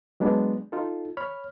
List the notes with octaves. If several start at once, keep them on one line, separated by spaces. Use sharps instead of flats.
F#3 G#3 B3 D4
D#4 F4 A4
C#5 B5 F6